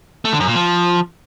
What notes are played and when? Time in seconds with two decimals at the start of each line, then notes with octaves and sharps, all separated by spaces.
0.25 A3
0.32 D3
0.40 F#2
0.48 A#2
0.55 F3